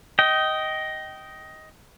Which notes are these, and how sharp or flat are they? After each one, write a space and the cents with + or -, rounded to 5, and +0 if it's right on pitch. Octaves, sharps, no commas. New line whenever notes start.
D#5 +10 G5 -20